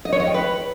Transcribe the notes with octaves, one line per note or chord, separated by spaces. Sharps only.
D#5
C#5
D#5
G5
B4